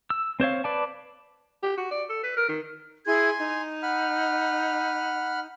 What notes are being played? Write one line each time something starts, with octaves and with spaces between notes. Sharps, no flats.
E6
C4 C5 C#5 F5
B4 D5 A5
G4
F#4
D5
A4
B4
A#4
D#3
E4 G#4 G#5 C6 G#6
D#4
F#5 B5 F6